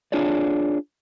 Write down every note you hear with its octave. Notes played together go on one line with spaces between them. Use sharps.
D4 F4 G#4 C#5 D5